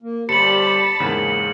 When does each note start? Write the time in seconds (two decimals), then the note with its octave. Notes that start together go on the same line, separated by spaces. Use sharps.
0.02 A#3
0.29 G1 G3 G4 C5 A5 B5 C#7 F#7
1.00 E2 G#2 C#3 A#3 G#4